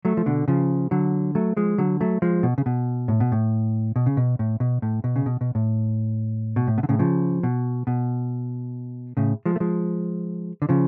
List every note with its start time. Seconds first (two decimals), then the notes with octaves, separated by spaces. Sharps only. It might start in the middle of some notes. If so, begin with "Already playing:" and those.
0.05 F#3 A3
0.17 F3
0.26 B2 D3
0.48 C#3 F3
0.91 D3 F#3
1.35 F#3 A3
1.57 F3 G#3
1.78 D3 F#3
2.01 F#3 A3
2.22 F3 G#3
2.43 B2
2.58 C#3
2.66 B2
3.08 A2
3.20 B2
3.32 A2
3.96 B2
4.06 C#3
4.17 B2
4.39 A2
4.60 B2
4.82 A2
5.04 B2
5.16 C#3
5.26 B2
5.41 B2
5.55 A2
6.56 B2
6.67 A2
6.78 B2
6.83 D3
6.89 A2 C#3
6.99 C#3 F3
7.43 B2
7.87 B2
9.17 A2 C#3
9.46 F3 G#3
9.56 A3
9.60 F3 G#3
10.62 D3
10.69 C#3 F3